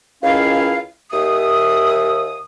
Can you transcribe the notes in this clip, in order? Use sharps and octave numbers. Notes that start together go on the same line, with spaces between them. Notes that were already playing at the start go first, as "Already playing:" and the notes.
C#2 D#3 C#4 E4 F5
D#2 E5 D#6